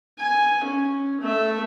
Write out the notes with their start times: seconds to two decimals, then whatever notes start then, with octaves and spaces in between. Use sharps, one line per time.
0.18 G#5
0.64 C#4
1.21 A3 E5